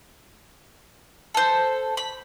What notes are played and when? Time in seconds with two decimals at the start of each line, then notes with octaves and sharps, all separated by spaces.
1.34 A4 C5
1.97 B5